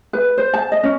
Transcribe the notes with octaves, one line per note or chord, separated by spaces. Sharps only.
B4
C5
A5
D#5
C#4